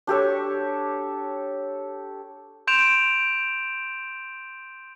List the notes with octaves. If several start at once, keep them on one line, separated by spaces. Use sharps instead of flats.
D4 G4 A4 C#5
C6 G6 D7 E7 F7